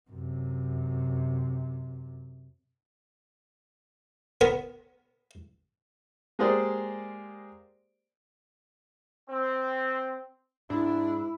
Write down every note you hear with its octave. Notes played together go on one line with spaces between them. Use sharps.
F#2 C3
B3 A#4
G#3 A#3 G4 G#4 C5 D5
C4
G#2 D4 E4